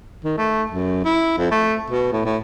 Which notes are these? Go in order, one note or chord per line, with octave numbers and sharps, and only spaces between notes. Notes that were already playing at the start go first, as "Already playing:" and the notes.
D#3
A3
F#2
E4
F2
A3
B2
A2
A2